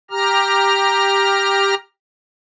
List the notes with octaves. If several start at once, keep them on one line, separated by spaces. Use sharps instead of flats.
G4 A#5 F6